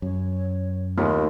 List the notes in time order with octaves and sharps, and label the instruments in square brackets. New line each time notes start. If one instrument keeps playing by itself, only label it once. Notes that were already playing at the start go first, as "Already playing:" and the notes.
[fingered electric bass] F#2 [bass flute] C#5
[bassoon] D#2 [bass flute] D#3 [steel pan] A3 B3 F4